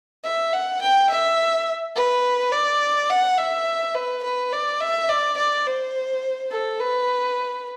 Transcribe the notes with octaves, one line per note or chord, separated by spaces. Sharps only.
E5
F#5
G5
E5
B4
D5
F#5
E5
B4
B4
D5
E5
D5
D5
C5
A4
B4